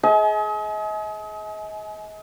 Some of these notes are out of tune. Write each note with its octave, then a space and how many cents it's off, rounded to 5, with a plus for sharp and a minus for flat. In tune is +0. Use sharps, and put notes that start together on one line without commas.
G#4 +25 D#5 +40 G#5 +40